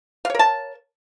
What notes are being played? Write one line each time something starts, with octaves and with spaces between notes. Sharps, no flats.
A#4 C#5 F5 A5